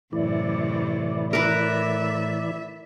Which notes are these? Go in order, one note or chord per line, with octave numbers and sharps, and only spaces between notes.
F#2 A2 C3 E3 E4 D5
A#4 B4 E5